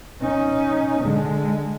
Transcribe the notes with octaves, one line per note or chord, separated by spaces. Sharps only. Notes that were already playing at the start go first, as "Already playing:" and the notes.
C#4 D#4
D3 G#3